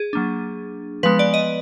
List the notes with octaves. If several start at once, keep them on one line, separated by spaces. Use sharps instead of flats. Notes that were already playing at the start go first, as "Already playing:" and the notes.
Already playing: G#4
F#3 A#3 D4
F3 G#3 B3 B4
D5
D#5